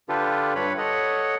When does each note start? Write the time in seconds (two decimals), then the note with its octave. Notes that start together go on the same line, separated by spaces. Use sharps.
0.09 D3 D4 F4 G4 A4 B4
0.55 G2 B4 C#5 B5
0.78 A4 C#5 D#5 F#5